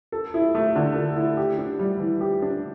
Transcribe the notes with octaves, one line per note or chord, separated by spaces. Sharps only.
A4
E4
A3
D3
A4
E4
G4
D4
G3
E3
G4
D4